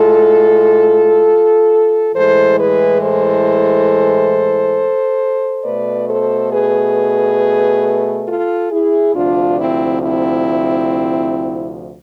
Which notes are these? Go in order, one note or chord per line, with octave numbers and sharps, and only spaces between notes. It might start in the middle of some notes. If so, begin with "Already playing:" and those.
Already playing: A2 G#3 F4 A4
A2 E3 G#3 A4 C5
G#4 B4
A4 C5
B2 A3 B4 D5
A4 C5
G#4 B4
F4 A4
E4 G#4
D2 C3 F3 D4 F4
C4 E4
C4 E4